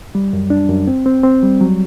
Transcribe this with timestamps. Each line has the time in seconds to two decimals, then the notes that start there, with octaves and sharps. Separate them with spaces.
0.15 G3
0.33 F#2
0.50 D4
0.69 F#2
0.87 C4
1.06 C4
1.23 C4
1.43 G3
1.61 F#3